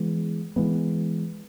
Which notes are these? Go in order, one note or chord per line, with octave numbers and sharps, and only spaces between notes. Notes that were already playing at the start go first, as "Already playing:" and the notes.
Already playing: E3 G#3 B3
E3 G#3 B3